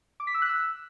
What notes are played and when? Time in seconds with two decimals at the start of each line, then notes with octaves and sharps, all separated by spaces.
0.20 D6
0.27 B6
0.34 E6
0.42 F#6
0.49 E6